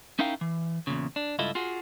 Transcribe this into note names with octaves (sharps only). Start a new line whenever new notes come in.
C#4 D#4 E4 A#4 F5 G5
E3
E2 A#2 C#3
D4
C#2 G2 E4 F4 A4 D#5
F4 F#4 G#4